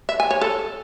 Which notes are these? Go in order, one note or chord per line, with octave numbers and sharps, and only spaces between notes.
E5
G#5
C#5
A4